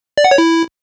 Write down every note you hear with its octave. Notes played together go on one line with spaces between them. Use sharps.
D5
F#5
C#5
E4